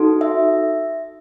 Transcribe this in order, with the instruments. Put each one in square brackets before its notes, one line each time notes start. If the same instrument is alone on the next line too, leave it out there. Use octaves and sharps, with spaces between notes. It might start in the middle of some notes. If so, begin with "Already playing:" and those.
Already playing: [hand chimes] D#4 F#4 A4
E5